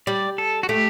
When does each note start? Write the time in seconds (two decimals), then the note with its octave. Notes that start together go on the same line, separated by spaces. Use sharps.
0.07 G3 D5
0.38 A4
0.63 F#4
0.69 A3 G4